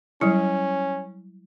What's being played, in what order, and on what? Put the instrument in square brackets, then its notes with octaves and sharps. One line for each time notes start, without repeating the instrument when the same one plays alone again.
[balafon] F#3 G3 E4 [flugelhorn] C#4